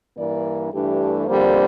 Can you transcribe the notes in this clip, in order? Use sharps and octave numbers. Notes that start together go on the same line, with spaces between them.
G2 E3 A#3 D4 D5
G2 E3 A3 D4 G4
F2 D3 G3 A#3 C5